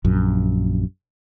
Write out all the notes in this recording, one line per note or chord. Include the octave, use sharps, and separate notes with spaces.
A#1 F#2